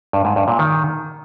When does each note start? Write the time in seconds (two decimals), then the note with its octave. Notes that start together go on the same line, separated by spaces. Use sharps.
0.13 G2
0.25 G#2
0.36 G2
0.48 A#2
0.59 D#3